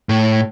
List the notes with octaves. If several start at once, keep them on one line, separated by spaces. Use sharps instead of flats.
A2